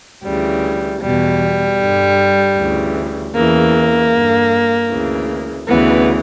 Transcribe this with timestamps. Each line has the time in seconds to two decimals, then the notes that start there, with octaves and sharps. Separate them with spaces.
0.23 D2 C#3 E3 G3
1.01 E2 B2 G3
1.78 G2 D3
2.57 D2 C#3 E3
3.34 E2 C#3 E3 A#3
4.12 G2 D3
4.89 D2 C#3 E3
5.67 D2 C#3 E3 B3